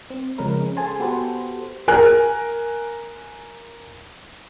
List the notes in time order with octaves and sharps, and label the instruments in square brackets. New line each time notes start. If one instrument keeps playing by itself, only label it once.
[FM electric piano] C4
C#3 F3 G#3 C#4 A#4 B4
C#4
G#4 A4 C5 G#5 A5 C6
B3 F#4 G4 A4 B4 C5
[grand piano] A#4 G#5 F#6